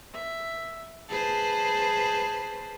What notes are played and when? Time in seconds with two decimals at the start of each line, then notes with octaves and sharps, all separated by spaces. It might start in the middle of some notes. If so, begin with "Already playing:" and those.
0.13 E5
1.09 G#4 B4 C5 A5